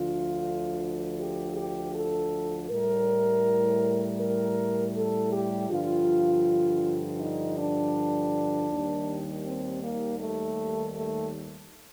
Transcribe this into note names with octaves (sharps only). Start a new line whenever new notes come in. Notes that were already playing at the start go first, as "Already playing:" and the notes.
Already playing: D2 D3 F3 F4
G4
G4
A4
A2 G3 A#4
A#4
A4
G4
G2 D3 F3 F4
D#4
D4
D#2 D#3 G3
C4
A#3
A3
A3